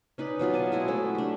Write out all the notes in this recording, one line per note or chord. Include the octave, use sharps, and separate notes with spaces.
C#4 D#4 B4 D5
B2 F#3 F4 D5
G#5 A5
G#3 E4 F#4 G#4
F#3 A3 C#4
D4 G4